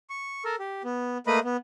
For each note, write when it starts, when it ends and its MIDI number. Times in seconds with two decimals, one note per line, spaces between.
0.10 0.44 85
0.45 0.56 69
0.45 0.56 70
0.59 0.82 67
0.84 1.18 59
1.27 1.40 57
1.27 1.40 58
1.27 1.40 71
1.27 1.40 75
1.27 1.40 83
1.44 1.57 59